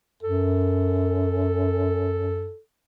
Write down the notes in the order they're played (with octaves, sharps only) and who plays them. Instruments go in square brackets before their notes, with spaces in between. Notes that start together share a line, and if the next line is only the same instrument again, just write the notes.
[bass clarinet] F#2 [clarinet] A4